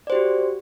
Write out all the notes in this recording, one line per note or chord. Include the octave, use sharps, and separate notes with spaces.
F#4 G4 C5 D5